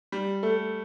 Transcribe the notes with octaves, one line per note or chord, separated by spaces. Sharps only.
G3
A3